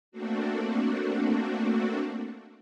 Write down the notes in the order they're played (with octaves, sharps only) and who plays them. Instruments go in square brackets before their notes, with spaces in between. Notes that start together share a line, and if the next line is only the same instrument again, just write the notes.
[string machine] A3 A#3 C4 D4 F#4